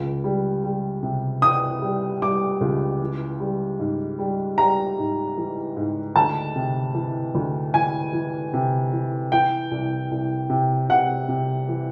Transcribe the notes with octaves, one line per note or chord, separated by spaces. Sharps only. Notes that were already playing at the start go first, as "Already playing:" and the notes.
Already playing: C#2
G3
G3
C3
E3 D#6
G3
G3 D6
C#2
E3
G3
G#2
G3
G3 A#5
G#2
E3
G#2
D2 A5
C3
E3
D2
E3 G#5
E3
C3
E3
E3 G5
C2
C2
C3
C3 F#5
C3
E3